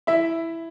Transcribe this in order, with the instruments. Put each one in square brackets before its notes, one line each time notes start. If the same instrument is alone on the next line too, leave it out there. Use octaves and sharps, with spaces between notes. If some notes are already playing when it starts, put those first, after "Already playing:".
[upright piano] E4 [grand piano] E5